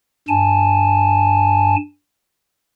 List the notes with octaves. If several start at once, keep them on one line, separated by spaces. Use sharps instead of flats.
G2 G#5 A5